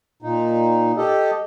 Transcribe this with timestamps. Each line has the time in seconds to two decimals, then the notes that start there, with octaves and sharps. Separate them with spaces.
0.22 A#2 D#4
0.97 G4 A4 D#5